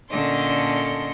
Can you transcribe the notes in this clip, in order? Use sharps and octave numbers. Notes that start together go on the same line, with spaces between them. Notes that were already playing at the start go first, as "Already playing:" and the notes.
A#2 D3 C#4 A4 D#5 C6